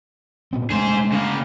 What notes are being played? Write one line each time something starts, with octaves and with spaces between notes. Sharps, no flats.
A#2 B3 C4
G#3 A3 D4 G#4 C5
C#3 A#3